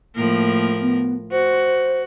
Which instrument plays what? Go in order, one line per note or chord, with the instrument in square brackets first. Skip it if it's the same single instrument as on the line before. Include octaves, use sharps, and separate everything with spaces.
[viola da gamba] A2 F3 A#4 [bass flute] A#3
[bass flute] B3
[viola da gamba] F#4 [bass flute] C5